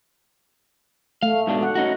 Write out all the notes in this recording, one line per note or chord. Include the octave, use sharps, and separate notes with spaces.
A3 F5
G#2 B2 D4
F#5
C#4 D#4 F#4